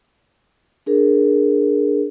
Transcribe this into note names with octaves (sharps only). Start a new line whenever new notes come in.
D4 G#4 A#4